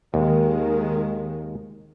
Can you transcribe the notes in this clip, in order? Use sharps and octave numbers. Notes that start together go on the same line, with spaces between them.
D#2 D#3 G#3